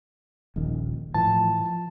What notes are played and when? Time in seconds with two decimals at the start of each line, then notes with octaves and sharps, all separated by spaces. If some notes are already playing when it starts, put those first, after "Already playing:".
0.56 D#1 A#1 D#3
1.14 A2 E3 F3 A5
1.60 F3